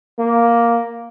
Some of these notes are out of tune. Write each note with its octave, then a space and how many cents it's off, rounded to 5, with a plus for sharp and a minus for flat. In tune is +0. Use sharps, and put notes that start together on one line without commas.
A#3 +5